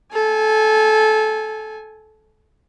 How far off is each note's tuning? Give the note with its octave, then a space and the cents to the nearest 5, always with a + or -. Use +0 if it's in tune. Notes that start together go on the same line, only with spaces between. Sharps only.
A4 -20 G#5 +0